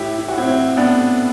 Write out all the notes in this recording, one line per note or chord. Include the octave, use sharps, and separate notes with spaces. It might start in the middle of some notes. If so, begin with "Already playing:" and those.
Already playing: A2 E4 G4
E4
F#4
A2 C4 E4
C4 E4
A2 B3 D4